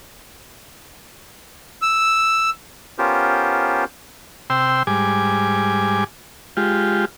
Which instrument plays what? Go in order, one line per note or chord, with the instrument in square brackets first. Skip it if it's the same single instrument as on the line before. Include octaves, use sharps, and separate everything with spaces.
[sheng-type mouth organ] E6
[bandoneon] B3 C#4 F4 G4 A#4 C5
[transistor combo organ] C3 G5 C6 E6
G#2 G3 G#5 D6
G#3 F4 G4